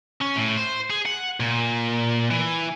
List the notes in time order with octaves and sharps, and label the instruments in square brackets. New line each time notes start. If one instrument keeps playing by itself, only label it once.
[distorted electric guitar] C#4
A2
C5
G#4
F#5
A#2
E3